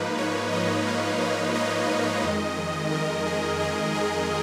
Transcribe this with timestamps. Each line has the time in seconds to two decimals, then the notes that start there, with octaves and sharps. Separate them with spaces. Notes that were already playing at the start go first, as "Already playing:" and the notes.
Already playing: G#2 F3 A#3 D#4 B4
0.18 C#5
0.52 D#5
0.87 F5
1.21 D#5
1.55 D#5
2.23 F2 D#3 G#3
2.92 A#4
3.26 G#4
3.60 G#4
3.95 G#4